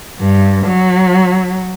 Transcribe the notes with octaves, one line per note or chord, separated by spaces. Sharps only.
G2
F#3